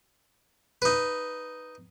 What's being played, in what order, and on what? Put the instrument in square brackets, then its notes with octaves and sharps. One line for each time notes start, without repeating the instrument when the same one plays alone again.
[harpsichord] D#4 B4